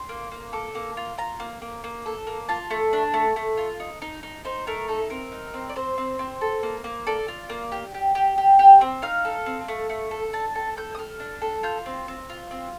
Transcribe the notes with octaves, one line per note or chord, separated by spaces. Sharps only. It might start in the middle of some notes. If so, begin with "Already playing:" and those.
Already playing: C6
A#3
A#3
A4 D6
A#3
F4
F4 A#5
A#3
A#3
A#3
A4
A#3
F4 A5
A3
D4
A3
A3
F4
D#4
D#4
D#4
D#4 C5
A3 A#4
D#4 A4
C4 A#4
D#4
C4
D5
C4 C5
C4
C4
A4
A#3
A#3
A4 D5
F4
A#3
G4
G4
G4
G4
G4
C4
D#4 F5
A4
C4
A3
A3
A4
D4 A5
A4 A5
A4 G6
D#6
A4 F6
D4
A4
F4 G6
C4
C4
F4
C4